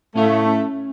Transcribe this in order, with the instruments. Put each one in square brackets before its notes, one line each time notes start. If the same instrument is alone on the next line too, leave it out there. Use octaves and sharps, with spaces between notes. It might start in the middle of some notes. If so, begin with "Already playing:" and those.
[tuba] A2 [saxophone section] A3 [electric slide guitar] C#4 F5
[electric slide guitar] C#4